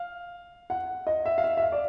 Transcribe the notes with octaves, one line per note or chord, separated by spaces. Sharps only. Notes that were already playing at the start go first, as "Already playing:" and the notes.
Already playing: F5
F#5
D#5
E5
F5
E5
E5
F5
D5